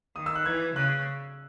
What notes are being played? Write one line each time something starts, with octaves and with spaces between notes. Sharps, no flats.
D#3 D#6
E6
F#6
E3 G#6
C#3 F#6